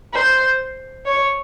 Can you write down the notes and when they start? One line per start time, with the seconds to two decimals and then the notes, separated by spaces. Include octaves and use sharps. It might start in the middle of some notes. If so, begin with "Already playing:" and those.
0.14 C5
1.05 C#5